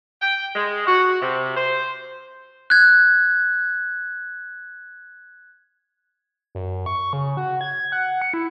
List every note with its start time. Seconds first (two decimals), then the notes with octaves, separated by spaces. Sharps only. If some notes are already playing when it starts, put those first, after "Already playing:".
0.21 G5
0.56 G#3
0.87 F#4
1.22 C3
1.57 C5
2.70 F#6 G#6
6.55 F#2
6.86 C#6
7.13 C#3
7.37 F#4
7.61 G#6
7.92 F#5
8.22 C#7
8.34 E4